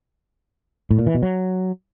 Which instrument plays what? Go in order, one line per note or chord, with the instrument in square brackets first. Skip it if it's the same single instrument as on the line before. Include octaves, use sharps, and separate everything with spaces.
[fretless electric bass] A2
A#2
E3
B2
F#3